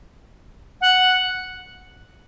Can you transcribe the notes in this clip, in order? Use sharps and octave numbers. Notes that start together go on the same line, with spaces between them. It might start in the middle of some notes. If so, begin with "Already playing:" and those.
F#5